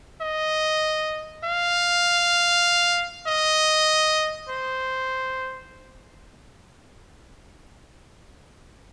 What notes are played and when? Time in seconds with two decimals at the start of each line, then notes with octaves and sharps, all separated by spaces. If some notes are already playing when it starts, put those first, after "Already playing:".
0.22 D#5
1.44 F5
3.27 D#5
4.49 C5